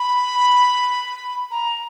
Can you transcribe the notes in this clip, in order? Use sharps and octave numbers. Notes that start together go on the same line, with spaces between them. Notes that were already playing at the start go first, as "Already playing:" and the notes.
Already playing: B5
A#5